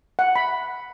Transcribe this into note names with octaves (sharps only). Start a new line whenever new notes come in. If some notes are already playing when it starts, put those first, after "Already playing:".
F#5
B5